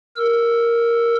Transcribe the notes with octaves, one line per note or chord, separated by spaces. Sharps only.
A#4 E6